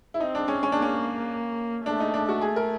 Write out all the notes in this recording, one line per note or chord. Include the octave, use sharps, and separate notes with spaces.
E4
C4 D#4
D4
C#4
C#4
A#3 D4
C#4
A3 D4
D#4
D4
F#4
G#4
A#4